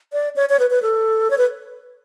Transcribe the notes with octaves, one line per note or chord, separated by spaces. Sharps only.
D5
C#5
C#5
B4
B4
A4
C#5
B4